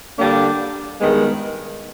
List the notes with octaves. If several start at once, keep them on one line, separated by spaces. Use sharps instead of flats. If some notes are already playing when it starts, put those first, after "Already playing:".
D3 G3 A#3 D4
G2 D#3 G#3 B3